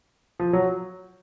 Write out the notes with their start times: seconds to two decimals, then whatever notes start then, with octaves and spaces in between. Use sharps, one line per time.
0.40 F3
0.53 F#3